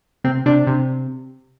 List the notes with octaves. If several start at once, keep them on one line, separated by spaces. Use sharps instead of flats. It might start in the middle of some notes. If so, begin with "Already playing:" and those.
C3 C4
C3 D4
C3